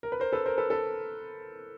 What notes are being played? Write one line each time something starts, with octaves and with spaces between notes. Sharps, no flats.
A#4
B4
A#4 C5
A4 B4
A#4 C5
A4 B4
A4 B4